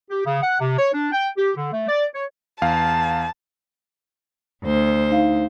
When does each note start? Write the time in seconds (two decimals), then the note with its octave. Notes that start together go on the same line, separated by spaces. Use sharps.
0.10 G4
0.26 C#3
0.42 F#5
0.60 C3
0.78 C#5
0.94 D4
1.12 G5
1.38 G4
1.56 D3
1.73 A3
1.88 D5
2.15 C#5
2.62 E2 F5 A5
4.65 D2 C5
5.11 D#4 F5